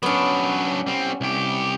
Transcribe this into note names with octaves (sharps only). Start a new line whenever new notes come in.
F#3 B3 C#4 D4
G3 C4
C2 G4